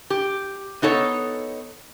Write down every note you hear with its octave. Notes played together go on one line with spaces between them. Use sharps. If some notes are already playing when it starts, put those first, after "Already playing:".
G4
B3 D#4 A4 C#5